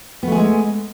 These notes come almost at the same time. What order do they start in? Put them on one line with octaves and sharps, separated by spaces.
B3 A3 G#4 G#3